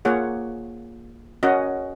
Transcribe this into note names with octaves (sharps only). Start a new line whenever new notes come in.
A#3 F4 G#4 C#5 F#5
C#4 F#4 A#4 D#5 F#5